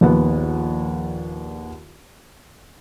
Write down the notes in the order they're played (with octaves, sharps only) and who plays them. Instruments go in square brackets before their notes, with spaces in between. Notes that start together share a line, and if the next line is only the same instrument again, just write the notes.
[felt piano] A#1 D#2 B3 F#5